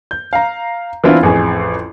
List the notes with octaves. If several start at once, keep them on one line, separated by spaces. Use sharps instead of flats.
G6
F5 A#5
E3 B3 C4 D4 E4 F4
A1 F2 G#4